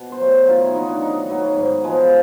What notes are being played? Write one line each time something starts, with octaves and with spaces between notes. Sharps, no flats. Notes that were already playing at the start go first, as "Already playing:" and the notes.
Already playing: B2
C5
F#3 A3
D#3 F4
E4
F#3 B3 D#4
D4
D#3 D#4
F#3 B3
G#2
F3 G#3 B3